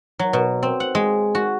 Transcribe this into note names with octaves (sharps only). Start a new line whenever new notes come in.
F#3
B2
C4
F#5
G#3
F#4